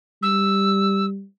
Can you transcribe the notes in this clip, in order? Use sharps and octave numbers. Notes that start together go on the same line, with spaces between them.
G3 E6